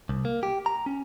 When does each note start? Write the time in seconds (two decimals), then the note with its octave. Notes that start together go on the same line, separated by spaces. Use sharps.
0.09 C2
0.25 A#3
0.43 G4
0.66 A#5
0.86 C#4